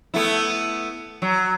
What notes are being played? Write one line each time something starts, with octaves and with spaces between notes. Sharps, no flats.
A3 B3 E4
F#3